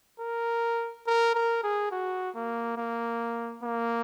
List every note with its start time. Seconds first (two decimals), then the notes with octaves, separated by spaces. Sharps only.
0.20 A#4
1.07 A#4
1.35 A#4
1.64 G#4
1.92 F#4
2.35 A#3
2.77 A#3
3.63 A#3